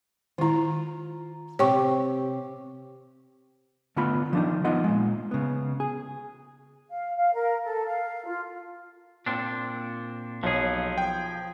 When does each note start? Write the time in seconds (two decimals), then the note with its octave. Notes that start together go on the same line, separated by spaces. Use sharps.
0.38 D#3 E4 F4 A#5
1.59 C3 C4 G4 C#5 G5 C#6
3.96 D3 A3 B3 F4 B5
4.33 F3 D4 D#4
4.65 B3 D#4 F4 D#5 F#5
4.84 A#2 G#3
5.31 C#3 B3
5.80 G#4
6.90 F5
7.16 F5
7.34 A#4
7.63 A4
7.86 F5
8.26 F4
9.26 A#2 C4 D4
10.43 B1 F3 G#4 C#5
10.98 G5